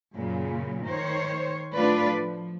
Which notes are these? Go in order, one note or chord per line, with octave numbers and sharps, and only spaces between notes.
F#2 A#2 C#3
D#3 C5 C#5
A2 F#3 D4 F4 B4 D5
F3